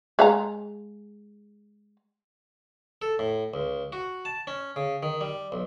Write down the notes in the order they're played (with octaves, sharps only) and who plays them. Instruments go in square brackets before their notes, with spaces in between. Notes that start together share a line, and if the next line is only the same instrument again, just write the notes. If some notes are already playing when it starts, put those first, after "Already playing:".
[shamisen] G#3 F5 A#5
[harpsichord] A4
A2
C#2
F#4
A5
C#4
C#3
D#3
G3
B1